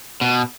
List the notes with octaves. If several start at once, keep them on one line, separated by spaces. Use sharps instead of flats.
B2